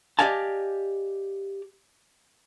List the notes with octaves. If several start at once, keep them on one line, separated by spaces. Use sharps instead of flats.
G4 D5 D#5 F5 G#5 A5